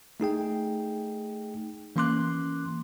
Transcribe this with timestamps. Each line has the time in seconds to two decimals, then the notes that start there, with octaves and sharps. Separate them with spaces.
0.20 A3 D#4 G#4 G5
1.96 E3 A#3 C#4 C6 D6 F#6